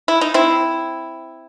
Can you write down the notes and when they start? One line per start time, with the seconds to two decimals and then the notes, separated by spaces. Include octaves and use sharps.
0.08 E4
0.21 D#4
0.34 C4 E4